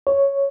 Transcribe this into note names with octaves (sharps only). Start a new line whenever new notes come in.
C#5